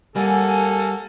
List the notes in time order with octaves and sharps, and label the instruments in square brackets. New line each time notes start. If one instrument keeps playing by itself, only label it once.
[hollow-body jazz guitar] G3 [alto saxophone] A#3 [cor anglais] A4 [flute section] F#5 G#5